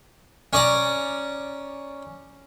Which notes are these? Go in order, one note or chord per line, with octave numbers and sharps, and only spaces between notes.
C#4 D5 A#5